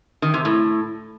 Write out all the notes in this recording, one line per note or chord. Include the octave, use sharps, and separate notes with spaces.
D#3
C3
A2